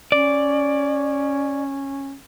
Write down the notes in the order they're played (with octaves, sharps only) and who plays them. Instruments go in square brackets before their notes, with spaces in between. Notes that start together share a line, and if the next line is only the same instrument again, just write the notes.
[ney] C#4 [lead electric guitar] D5